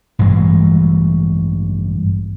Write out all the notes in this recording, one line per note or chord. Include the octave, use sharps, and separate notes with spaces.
A1 G2 E3 G#3